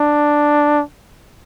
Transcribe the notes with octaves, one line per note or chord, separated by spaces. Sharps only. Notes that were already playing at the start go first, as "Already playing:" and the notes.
Already playing: D4